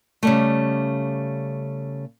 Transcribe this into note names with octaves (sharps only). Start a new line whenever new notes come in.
C#3 G3 A3